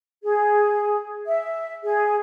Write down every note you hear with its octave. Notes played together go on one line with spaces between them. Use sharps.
G#4
E5
G#4